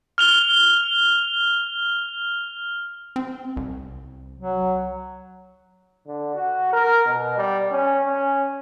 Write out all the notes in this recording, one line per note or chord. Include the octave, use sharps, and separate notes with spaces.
F6 F7 G7
C4
C2
F#3
D3
F#4
A#4
B2
G3
C#4
C#4